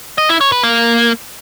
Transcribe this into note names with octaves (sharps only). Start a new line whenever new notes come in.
D#5
E4
C#5
B4
A#3